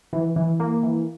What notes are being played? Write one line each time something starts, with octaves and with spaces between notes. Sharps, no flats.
E3
E3
A#3
E3